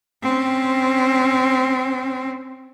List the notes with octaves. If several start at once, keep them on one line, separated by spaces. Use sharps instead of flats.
C4 C#4